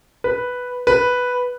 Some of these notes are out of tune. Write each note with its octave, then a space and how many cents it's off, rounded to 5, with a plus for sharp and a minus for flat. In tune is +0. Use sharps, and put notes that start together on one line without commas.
B4 +0
B4 +0